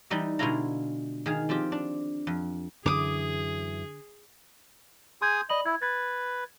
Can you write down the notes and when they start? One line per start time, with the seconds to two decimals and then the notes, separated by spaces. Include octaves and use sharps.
0.10 E3 G3 D#4 D#5 E5
0.39 B2 D3 G#3 E4 F4 A#5
1.26 D#3 G#4 F5
1.49 F3 C4 F4 G4
1.72 D4
2.27 F2
2.86 F#2 D3 E3 G#4 D6 D#6
5.22 G#4 G#5 C6 D#6 G6 G#6
5.50 D5 D#5 B5 F#7
5.66 E4 G#6
5.82 B4 G#6 A6